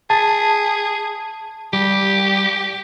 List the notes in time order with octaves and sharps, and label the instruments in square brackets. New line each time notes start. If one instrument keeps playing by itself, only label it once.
[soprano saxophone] G#4 [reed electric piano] A5
[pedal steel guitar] G3 [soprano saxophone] G4